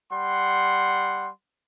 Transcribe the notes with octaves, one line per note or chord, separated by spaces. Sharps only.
G3 F#5 C6